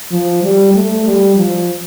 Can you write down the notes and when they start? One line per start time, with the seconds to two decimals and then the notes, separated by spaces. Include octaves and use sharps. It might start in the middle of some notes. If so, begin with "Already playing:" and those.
0.11 F3
0.43 G3
0.74 A3
1.05 G3
1.36 F3